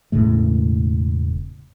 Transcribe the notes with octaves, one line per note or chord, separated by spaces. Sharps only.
E1 A2 C#3 A3